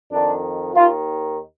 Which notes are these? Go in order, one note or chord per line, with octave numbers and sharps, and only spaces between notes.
F2 D#3 D4
D#2 D#3 F4